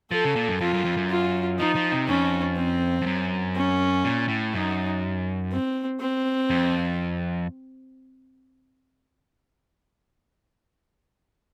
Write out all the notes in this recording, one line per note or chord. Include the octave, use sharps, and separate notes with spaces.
F3 A4
C#3
A#2
F#2
F2 F4
F#2
F2
F#2
F4
F3 D#4
F3
C3
F2 C#4
C4
F2
F#2
C#4
A#2
A2
F#2 D#4
C4
C4
F2